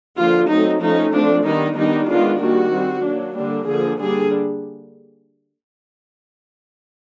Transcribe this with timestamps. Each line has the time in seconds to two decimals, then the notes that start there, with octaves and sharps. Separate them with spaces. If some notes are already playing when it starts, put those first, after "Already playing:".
0.18 D3 F3 A#3 F4
0.50 F#3 A3 C4 D#4
0.82 F3 A3 C#4 D#4
1.14 F3 A3 C4 D4
1.46 D#3 G3 B3 D4 D#4
1.77 D#3 G3 B3 D4 D#4
2.09 D#3 G#3 B3 D4 F4
2.41 D#3 G3 A#3 F#4
2.73 G3 C4
3.05 F#3 A#3 D4
3.37 D3 G3 A#3 D4
3.69 D3 F3 A#3 G#4
4.01 D3 G3 A#3 D4 G#4